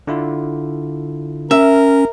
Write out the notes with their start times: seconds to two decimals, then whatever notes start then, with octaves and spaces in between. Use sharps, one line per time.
0.07 D3 E4 F4
1.51 C#4 A#4 E5